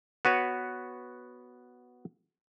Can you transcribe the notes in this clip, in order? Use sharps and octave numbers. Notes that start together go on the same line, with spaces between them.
B3 F#4 B4 C#5